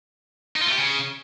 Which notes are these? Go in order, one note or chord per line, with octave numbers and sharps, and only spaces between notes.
D#4
F4
A3
G4
C#3